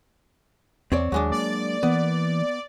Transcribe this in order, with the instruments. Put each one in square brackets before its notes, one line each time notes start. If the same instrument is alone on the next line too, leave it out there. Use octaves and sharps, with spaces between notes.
[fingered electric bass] E2 [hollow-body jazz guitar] C4 C#5 D5
[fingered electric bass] D#2 [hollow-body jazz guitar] F#3 G#3 D4
[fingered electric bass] A#3 [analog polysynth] D5
[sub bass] E3 [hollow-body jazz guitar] B3